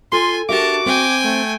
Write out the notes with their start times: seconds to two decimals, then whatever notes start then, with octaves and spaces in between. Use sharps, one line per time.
0.12 F4 A4 G#5 C6
0.49 D4 F#4 G4 A#4 E5 A5 D6
0.86 C4 G5 G#5
1.23 A3